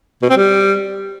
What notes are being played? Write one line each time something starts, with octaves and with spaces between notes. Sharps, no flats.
B2
C4
G3